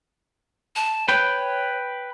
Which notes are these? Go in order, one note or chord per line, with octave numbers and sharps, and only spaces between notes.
A5
B4 C#5 G5